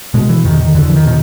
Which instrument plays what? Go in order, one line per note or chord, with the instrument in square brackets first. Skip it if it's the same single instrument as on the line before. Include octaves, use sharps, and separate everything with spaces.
[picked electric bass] B2 G#3
E3
E2 D#3
D#3
E2 D3
E3
D#3
B2 D#3